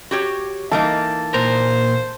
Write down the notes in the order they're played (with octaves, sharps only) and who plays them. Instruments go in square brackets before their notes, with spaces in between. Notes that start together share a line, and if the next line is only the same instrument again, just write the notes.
[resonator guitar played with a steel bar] F#4 G4 C#5
[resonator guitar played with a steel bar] E3 A#3 D#4 [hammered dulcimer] A5
[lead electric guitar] A#2 A#4 [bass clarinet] C5